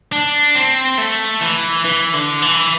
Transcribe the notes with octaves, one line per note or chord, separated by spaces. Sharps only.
D4
C4
A3
E3
E3
D3
E3